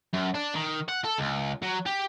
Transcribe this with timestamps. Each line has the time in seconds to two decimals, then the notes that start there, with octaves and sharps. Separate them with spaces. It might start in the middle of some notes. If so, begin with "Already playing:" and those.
0.14 F#2
0.35 D4
0.55 D#3
0.89 F#5
1.04 A4
1.18 C#2
1.62 F#3
1.86 G4